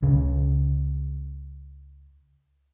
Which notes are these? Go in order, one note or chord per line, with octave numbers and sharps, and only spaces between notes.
C#2 C#3